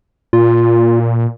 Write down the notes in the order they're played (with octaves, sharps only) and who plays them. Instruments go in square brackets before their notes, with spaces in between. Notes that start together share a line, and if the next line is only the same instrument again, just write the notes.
[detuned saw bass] A#2 [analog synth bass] F4